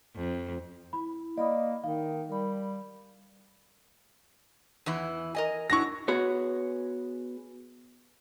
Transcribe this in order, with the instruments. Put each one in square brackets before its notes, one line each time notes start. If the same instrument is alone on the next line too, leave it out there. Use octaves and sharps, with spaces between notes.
[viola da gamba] F2
[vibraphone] E4 [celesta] B5
[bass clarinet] A#3 [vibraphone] D5 B5 D#6 [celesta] D#5
[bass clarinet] D#3 [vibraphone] D#4 [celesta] F5
[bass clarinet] G3 [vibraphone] A#4 B5
[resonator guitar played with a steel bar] E2 E3 E4
A#4 D#5 G#5
[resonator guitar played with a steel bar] F#3 D4 E4 [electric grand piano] C#6 A#6
[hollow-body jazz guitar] B3 F#4 G#4 C#5